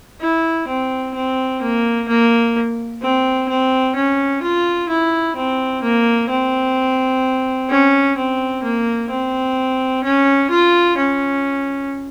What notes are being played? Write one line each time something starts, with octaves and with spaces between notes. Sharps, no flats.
E4
C4
C4
A#3
A#3
C4
C4
C#4
F4
E4
C4
A#3
C4
C#4
C4
A#3
C4
C#4
F4
C#4